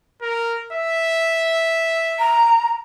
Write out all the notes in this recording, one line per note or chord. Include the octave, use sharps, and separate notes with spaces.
A#4
E5
A#5